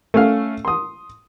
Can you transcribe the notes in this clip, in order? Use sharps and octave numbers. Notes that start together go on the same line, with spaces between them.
A3 C#4 F5
C6 D#6